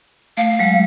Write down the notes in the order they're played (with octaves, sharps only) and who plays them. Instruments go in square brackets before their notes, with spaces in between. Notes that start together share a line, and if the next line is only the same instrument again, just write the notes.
[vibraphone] A3 [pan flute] F5
[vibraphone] F#3 G#3